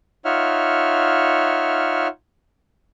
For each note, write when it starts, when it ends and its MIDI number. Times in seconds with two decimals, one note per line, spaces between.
0.25 2.07 63
0.25 2.07 65
0.25 2.07 73
0.25 2.07 76
0.25 2.07 78
0.25 2.07 89